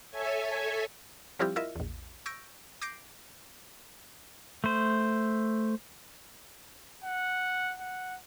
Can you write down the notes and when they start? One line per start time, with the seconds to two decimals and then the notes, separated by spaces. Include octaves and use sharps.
0.11 A4 C#5 E5 G#5
1.39 F3 G3 C4 E4 F4 G4
1.56 E4 F4 A#4 D#5 E5
1.76 A#1 E2
2.26 C#6 E6 G6 A#6 D7
2.82 D6 G6 A#6 C7 D7
4.64 A3 C5
7.04 F#5
7.80 F#5